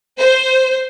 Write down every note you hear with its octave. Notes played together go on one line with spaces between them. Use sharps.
C5